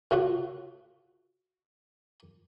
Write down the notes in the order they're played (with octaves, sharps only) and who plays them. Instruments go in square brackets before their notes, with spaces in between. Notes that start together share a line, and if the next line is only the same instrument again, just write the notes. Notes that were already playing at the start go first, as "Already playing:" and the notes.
[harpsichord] A2 F4 F#4